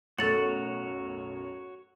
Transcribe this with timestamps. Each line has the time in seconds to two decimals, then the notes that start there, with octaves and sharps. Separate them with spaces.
0.19 B1 F#2 A2 F#4 A4 C#5 A6 F#7